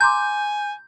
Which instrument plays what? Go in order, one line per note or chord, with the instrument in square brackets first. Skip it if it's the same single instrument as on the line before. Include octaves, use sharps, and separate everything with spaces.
[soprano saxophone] G#5 [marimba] A#5 C6 D6 [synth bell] G6